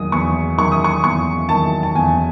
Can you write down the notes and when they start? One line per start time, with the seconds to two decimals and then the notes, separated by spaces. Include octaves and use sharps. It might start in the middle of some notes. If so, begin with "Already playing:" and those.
Already playing: E2 D#3 F#3 D#6
0.12 E2 C#6
0.58 D#3 F#3 C#6
0.72 D#6
0.84 C#6
1.04 E2 C#6
1.49 D#3 F#3 A5
1.83 A5
1.95 E2 G#5